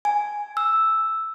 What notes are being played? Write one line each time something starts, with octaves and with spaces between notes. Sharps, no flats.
G#5
E6